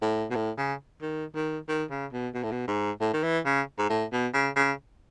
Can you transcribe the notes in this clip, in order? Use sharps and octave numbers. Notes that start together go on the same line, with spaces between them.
A2
B2
A2
C#3
D#3
D#3
D#3
C#3
B2
B2
A2
B2
G#2
A2
D#3
E3
C#3
G#2
A2
B2
C#3
C#3